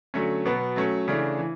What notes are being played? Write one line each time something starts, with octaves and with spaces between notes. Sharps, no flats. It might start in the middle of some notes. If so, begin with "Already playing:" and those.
D3 F#3 A3 C#4
B2 F#3 B3
F#3 A3 C#4
C#3 E3 A3 D4
E3